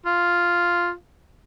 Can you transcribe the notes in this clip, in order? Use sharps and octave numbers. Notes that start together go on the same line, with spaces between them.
F4